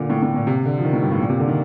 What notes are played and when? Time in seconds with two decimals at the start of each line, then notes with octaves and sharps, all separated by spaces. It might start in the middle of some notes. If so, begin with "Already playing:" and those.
Already playing: A#2 D3
0.10 A2
0.22 A2
0.34 A#2
0.47 C3
0.65 D3
0.78 F3
0.84 D#3
0.93 A2
1.02 G2
1.11 A2
1.20 A#2
1.29 C3
1.39 D3
1.48 D#3